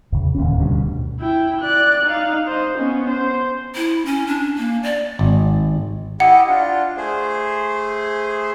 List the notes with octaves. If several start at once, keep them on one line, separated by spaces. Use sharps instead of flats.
E2 C#3
D1 D#2 C#4
D2 G2 B2
E4 G5
D5 F#6
D#4 F5
C5 D#5
B3 C#4
C5
E4
C#4
D4
A#3
D5
G#1
E4 G4 D#5 F#5
D4 F4
A3 G#4 C5